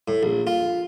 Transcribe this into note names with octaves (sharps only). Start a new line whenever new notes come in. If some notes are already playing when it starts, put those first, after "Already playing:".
A2
A#1
F4